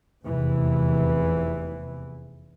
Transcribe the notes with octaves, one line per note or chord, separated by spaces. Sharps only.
F1 E2 C3 E3